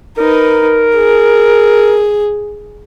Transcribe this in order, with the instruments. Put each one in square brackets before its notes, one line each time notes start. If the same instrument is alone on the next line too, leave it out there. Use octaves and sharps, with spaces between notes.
[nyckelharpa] D#4 B4 [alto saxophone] A#4
[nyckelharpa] G#4